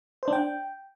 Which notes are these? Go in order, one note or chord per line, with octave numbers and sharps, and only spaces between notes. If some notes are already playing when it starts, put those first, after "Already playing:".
C5
D4
G5